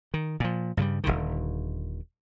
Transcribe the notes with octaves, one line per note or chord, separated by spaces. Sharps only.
D#3
A#2 F3
G2 C#3 E3 G3
D#1 G#1 D3 D#3